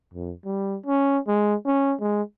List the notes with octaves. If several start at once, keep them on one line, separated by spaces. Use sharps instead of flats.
F2
G3
C#4
G#3
C#4
G#3